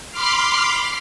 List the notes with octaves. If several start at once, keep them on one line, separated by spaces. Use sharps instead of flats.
B5 C6 D6 F6 C7